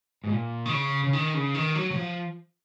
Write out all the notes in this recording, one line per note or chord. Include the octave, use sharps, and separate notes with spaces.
G#2
A#2
D#3
C#3
C#3
D#3
C#3
D#3
F#3
F#3
F3